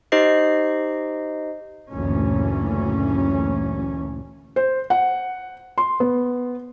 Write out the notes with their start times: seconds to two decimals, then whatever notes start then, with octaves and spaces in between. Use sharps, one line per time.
0.12 D#4 G4 C5 D#5 C7
1.91 F#1 D2 A#2 E3 C#4
4.56 C5
4.90 F#5
5.78 C6
6.00 B3